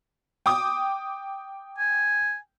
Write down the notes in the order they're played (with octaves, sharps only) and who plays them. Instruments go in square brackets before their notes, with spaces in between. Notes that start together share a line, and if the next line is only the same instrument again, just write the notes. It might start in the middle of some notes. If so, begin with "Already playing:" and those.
[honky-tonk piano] G5 D6 D#6
[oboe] G#5